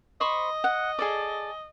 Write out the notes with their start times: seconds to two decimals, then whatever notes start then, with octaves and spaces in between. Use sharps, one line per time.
0.21 C5 D#5 B5 C#6
0.64 F#5
0.99 G#4 A4 D5